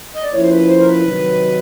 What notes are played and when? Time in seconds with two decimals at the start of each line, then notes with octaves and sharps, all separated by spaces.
0.15 D#5
0.23 D5
0.32 F3 A#3 C#4 E4 C#5
0.42 C5
0.50 B4
0.68 C5
0.80 A#4
0.87 B4
1.05 C3 D#3 F#3